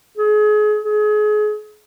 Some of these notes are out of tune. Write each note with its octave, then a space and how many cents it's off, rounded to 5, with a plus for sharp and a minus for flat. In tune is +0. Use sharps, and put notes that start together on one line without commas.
G#4 +30
G#4 +30